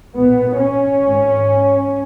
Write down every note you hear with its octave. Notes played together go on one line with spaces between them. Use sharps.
B1 A#2 B3
C#4
G#1 G#2